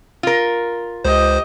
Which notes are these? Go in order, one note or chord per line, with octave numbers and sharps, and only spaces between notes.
F4 A#4
C#2 G4 C5 D#5